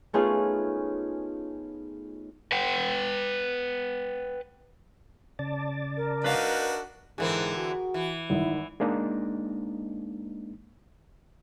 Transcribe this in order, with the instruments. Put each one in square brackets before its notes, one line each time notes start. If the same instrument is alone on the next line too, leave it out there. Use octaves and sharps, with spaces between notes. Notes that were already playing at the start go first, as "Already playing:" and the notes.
[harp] A3 B3 C#4 D#4 F4 G#4
[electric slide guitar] B4 F#5 G5
[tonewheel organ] C#3 D5 A5
[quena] A#4
[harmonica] D4 D#4 F#4 [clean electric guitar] B4 F5
[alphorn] G#2 [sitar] D3 E3 C4 [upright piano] G#4 A#4
[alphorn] F#4
[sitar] E3
[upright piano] G#1 D#3 [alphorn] E4
[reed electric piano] G#3 A#3 D4 D#4